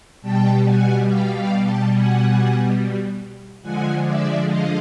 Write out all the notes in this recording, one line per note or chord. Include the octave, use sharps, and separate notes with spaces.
B2 G3 G5 A5
F#5 G#5
F5 G5
F5 G5
G5 A5
F#5 G#5
D3 F3 G#3 F#5 G#5
D5 E5
D#5 F5